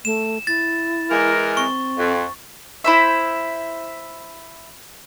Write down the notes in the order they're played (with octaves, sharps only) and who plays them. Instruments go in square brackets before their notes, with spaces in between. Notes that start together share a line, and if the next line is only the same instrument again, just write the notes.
[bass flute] A3 [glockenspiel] E7
[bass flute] E4 [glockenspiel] A6
[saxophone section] E3 G#3 A#4
[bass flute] C4 [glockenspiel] C#6
[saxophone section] F2
[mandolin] E4 C5 E5